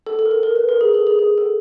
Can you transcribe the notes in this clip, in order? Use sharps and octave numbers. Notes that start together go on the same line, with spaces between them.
A4
A4
A#4
A4
A#4
B4
A#4
G#4
A4
G#4
G#4
A4